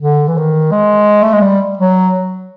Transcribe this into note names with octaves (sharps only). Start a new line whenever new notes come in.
D3
E3
D#3
G#3
A3
G#3
G3
F#3